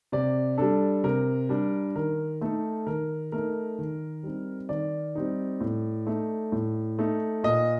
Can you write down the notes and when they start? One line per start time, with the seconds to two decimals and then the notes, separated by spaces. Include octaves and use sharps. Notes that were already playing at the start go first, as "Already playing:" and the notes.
0.12 C3 D5
0.58 G3 D4 A4
1.04 C3 A#4
1.49 G3 D4
1.96 D#3 A#4
2.41 A3 D#4 A4
2.87 D#3 A#4
3.32 A3 D#4 A#4
3.79 D#3
4.23 G3 C4 D#4
4.69 D#3 D5
5.15 G3 C4 D#4
5.61 A2
6.07 A3 D#4
6.52 A2
6.99 A3 D#4
7.44 A#2 D#5